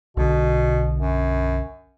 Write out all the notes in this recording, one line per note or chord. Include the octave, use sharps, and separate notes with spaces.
B1 B2 D3
F#2